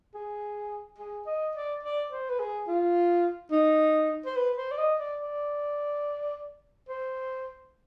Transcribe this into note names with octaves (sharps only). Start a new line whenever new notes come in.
G#4
G#4
D#5
D5
D5
C5
B4
G#4
F4
D#4
C5
B4
C5
D5
D#5
D5
D5
C5